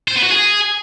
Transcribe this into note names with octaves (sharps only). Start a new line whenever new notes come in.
C5
B3
F#4
G#4